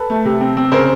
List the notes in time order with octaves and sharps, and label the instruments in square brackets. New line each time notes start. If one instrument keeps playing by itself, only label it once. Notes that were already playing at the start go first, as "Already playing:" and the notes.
Already playing: [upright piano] A4 B4
A3
C3
C4
C4
C#3 A#4 C5